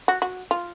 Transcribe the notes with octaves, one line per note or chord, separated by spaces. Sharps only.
F#4
F#4
F4